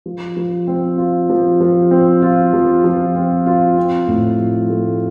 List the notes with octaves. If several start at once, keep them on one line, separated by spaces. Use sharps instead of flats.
F3
F3
C4
F4
F3
F3
C4
F4
F3
F3
C4
F4
C4
A2
F3
A3